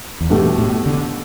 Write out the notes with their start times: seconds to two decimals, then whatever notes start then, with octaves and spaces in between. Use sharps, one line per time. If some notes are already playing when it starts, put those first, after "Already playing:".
0.21 E2
0.30 G2 B2 A3 G4
0.58 A2
0.86 D3